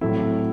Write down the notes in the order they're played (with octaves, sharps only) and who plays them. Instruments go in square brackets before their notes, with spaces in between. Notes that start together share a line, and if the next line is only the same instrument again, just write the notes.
[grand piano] A2 F#3 A3 C4 E4